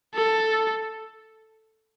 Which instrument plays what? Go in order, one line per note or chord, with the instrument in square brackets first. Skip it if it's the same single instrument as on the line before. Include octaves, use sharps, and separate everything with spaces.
[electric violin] A4